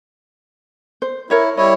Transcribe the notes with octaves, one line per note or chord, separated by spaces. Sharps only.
C5
E4 A#4 C#5 E5
G3 E4 C#5 D#5